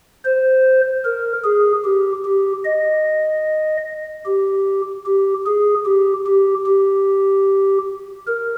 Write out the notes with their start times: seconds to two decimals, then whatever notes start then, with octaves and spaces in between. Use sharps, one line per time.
0.25 C5
1.05 A#4
1.44 G#4
1.85 G4
2.25 G4
2.65 D#5
4.26 G4
5.06 G4
5.46 G#4
5.86 G4
6.27 G4
6.66 G4
8.27 A#4